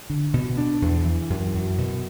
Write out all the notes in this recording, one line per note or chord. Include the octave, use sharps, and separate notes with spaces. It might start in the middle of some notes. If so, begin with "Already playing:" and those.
D3
B2
D4
E2
E3
F#2
F#2
B2